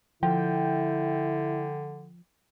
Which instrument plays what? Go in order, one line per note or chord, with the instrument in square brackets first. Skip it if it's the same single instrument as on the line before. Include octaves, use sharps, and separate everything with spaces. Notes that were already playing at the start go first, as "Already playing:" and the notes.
[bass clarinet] D3 [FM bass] F3 [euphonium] E4 [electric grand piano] G5